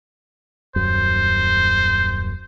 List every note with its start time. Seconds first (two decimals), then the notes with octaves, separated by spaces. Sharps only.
0.76 D#1 F#2 C5